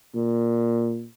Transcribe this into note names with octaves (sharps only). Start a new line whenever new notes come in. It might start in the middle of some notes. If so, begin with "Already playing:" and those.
A#2